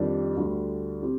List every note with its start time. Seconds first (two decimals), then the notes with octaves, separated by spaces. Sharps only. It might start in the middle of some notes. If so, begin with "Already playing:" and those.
Already playing: F2 D#3 G3 D4 G4
0.36 D2 D3 G3 D4
1.02 C4 G4